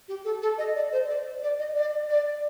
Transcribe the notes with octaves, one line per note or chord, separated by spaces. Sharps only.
G4
A4
A4
D#5
D5
C5
D5
D5
D#5
D5
D5